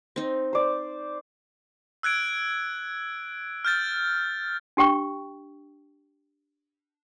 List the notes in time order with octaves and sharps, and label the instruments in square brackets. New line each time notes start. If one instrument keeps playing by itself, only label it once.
[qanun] C4 D#4
[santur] C5 D5
[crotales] E6 F#6 G#6 D7
F6 G6 A6
[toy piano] D4 G4 G5 C#6